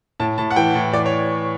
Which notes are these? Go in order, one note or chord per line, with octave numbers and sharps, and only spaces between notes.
A2 A5
A2 A5
F#5
E3 G5
A2
E3 D5
C#5